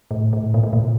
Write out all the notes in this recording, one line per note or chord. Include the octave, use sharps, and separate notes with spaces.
A2
A2
A#2
A2
A#2